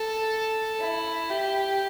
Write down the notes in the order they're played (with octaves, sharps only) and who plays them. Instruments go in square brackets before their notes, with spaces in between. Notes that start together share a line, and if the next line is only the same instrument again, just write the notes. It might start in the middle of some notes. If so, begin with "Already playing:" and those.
Already playing: [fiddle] A4
E4
G4